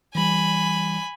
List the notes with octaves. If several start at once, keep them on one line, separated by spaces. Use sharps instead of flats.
E3 G3 G#5 B5